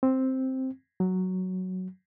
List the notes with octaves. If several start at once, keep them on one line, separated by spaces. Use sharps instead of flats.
C4
F#3